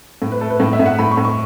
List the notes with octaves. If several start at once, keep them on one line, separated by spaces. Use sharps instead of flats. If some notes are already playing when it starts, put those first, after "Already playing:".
A2
B4
A3 A4
B4
A2
E5
A2
F#5
A2 B5
C#6
A2
C#6